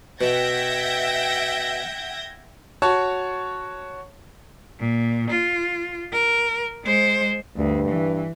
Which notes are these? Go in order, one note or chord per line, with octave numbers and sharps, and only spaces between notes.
B2 E5 F#5 G5 G6 G#6 A#6
F#4 C#5 A5
A#2
F4
A#4
G#3 C5
D2 G2
E3